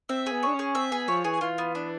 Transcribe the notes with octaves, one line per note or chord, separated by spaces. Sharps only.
C4 E5
G#4
B3
D4 C#5
C#4
G#4
C4 E5
B3 G#4
F3 C#5
E3 G#4
E3 F4
B3
D4